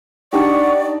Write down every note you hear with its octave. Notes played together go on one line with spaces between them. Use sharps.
D4 D#4 G4 D5 F#5 C#6